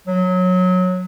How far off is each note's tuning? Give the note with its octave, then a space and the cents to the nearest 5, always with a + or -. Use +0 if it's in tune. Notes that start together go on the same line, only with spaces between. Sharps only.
F#3 -15